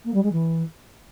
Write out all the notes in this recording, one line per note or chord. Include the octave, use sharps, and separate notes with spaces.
A#3
G3
G#3
E3